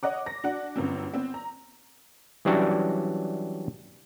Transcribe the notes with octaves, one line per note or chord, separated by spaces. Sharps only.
C#5 D#5 F#5 D6
A#6
D4 F#4 F#5
G1 F#2 D3 C4
B3 C4
A#5
E3 F#3 G3 C#4 D4 F#4